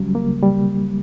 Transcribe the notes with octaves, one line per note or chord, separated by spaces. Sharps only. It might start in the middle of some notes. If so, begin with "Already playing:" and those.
Already playing: C#2 C#3 F#3 G3
A#3
G3